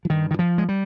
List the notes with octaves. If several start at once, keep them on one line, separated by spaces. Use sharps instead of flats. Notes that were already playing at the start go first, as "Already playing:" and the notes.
F3
G2 D#3
D#3
F3
G#3
G3